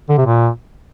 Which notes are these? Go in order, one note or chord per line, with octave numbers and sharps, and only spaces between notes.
D3
C3
A#2